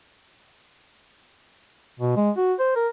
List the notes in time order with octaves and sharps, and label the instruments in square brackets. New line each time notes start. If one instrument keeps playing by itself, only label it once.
[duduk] B2
G#3
F#4
C5
A#4